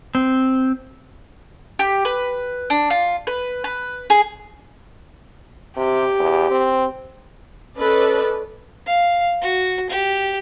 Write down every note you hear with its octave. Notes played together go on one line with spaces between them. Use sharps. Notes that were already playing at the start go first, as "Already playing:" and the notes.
C4
G4
B4
D4
F4
B4
B4
G#4
C3 G4
E2
C4
C#4 A4 B4 D5 D#5
F5
F#4
G4